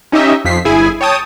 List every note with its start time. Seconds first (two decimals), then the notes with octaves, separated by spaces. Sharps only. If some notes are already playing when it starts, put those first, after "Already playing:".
0.12 C#4 D#4 G4 D#5 E5
0.45 F2 F3 B6 C7
0.65 G1 E4 G#4 G#5
1.01 C#5 G5 A5 D#6